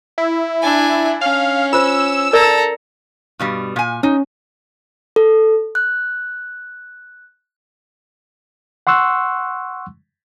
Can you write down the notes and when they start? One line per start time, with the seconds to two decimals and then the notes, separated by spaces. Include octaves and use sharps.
0.18 E4
0.62 D4 G#5
1.21 C#4 F5
1.73 F4 C5 E6
2.33 A4 A#4 D5 A#5
3.39 G2 B2 G3
3.76 A#2 G#5
4.03 C#4 D#4
5.16 A4
5.75 F#6
8.87 F#5 C6 C#6 E6 F#6